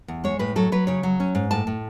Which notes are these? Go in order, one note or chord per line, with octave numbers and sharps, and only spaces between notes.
E2
G#3 C#5
A2 B4
F#3 A4
F#3 B4
C#3 C#5
F#3
C#4
G#2
A2 A5
A2